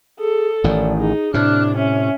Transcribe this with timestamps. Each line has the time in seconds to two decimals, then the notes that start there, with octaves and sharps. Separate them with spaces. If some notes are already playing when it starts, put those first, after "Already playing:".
0.20 G#4 A4
0.64 A1 A2 D#3 D5
0.98 D#4 G#4
1.34 A2 C3 D4 F6 F#6
1.77 C#4 E5